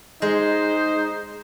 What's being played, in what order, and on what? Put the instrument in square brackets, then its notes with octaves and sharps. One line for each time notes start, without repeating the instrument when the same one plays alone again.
[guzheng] G#3 [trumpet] D#4 [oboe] C5